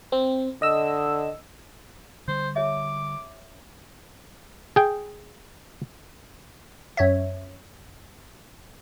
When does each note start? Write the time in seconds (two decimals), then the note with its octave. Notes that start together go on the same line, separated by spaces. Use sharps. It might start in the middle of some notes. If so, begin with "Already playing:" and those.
0.12 C4
0.62 D3 D#5 E6
2.28 D3 G3 C5
2.56 G4 C#5 E5 D6
4.76 G#4 G5
6.97 F#2 C#5 E5